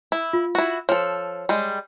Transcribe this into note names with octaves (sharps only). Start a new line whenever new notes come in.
E4
F4
E4 F#4
F3 A4 C#5
G3 G#3